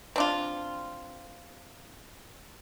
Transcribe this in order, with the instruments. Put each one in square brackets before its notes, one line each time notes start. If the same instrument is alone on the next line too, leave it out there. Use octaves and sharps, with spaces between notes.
[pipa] C4 D4 F4